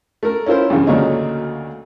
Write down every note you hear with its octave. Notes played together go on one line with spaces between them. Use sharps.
A3 A#4
C#4 E4 F4 A#4 C5
G2 C#3 E3
D2 A#2 C#3 F#3 A3 D#4